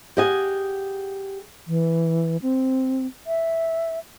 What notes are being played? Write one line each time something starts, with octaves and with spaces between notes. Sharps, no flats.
G4 G#4 D#5 F#5 G#5
E3
C4
E5